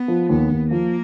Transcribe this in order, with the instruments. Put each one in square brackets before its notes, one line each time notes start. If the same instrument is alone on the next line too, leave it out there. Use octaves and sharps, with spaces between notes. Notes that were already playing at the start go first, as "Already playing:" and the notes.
Already playing: [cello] B3
[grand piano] F3
[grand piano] D#2 [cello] B3
[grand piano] D#2
[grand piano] F3 [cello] A#3